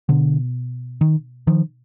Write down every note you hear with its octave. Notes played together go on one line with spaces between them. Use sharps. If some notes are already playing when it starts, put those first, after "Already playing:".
B2 D3
D#3
D#3 F3